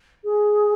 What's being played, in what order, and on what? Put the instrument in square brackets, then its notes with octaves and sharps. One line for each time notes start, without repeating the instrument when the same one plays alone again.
[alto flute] G#4